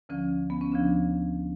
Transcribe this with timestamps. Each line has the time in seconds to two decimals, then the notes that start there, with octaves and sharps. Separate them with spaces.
0.09 D2 D3 F3 C#4
0.50 B3
0.61 C#4
0.72 D2 C#3 F3 D4